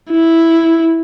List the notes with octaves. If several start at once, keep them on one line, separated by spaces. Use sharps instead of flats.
E4